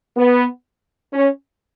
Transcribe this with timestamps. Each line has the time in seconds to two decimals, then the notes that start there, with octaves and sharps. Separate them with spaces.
0.17 B3
1.13 C#4